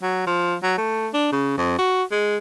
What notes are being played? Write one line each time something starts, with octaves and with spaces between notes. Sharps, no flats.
F#3
F3
F#3
A3
D4
C#3
F2
F#4
G#3